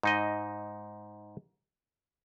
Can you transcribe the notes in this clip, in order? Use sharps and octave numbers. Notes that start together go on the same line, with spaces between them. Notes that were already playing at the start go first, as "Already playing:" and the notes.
G#2 D#4 D#5